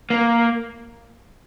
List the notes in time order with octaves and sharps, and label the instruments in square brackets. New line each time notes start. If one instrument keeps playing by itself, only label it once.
[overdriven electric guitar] A#3